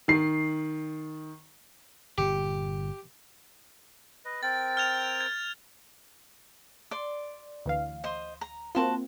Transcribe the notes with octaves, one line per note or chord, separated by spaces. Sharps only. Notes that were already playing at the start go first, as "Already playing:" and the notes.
D#3 C7
G1 A#2 G4
B4 D#5
C4 A#4 G5 A6
F6 G#6 F7
G#6
D5 C6
D2 E3 F5
C5 D#5 C6
A#5
A#3 C4 F4 F#4 A5 C6